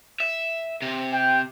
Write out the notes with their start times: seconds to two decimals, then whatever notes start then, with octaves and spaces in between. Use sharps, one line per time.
0.20 E5
0.82 C3
1.13 G5